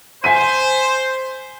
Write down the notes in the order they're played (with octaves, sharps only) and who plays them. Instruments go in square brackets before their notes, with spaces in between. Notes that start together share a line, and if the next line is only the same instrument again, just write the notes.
[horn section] C5 [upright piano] G#5 B6 D#7